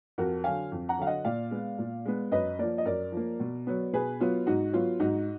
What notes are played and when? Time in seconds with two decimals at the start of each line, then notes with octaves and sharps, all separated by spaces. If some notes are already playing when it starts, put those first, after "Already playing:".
0.18 F2 F#4 A#4
0.44 D3 F#3 F5 G#5
0.72 F2
0.89 F#5 A#5
0.99 D3 F#3 F5
1.07 D#5 F#5
1.25 A#2 D5 F5
1.51 G#3 B3
1.78 A#2
2.06 G#3 B3
2.31 F#2 B4 D#5
2.59 F3 A#3 A#4 D5
2.78 D#5
2.85 F#2 A#4 D5
3.12 F3 A#3
3.40 B2
3.67 F#3 B3
3.93 B2 G#4 B4
4.20 F#3 B3 F4
4.47 G#2 D#4 F#4
4.73 F#3 B3 F4
5.00 G#2 D#4 F#4